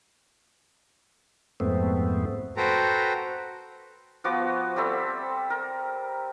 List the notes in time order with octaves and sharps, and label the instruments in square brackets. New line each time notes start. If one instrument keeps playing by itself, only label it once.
[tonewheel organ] F2 G#2 A3 B3 C4
[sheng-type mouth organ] F#4 A4 B4 C5 G5 A#5
[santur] F3 B3 F#4 D6
G3 C4 A4 E5
A#4